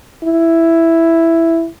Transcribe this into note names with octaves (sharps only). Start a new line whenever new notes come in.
E4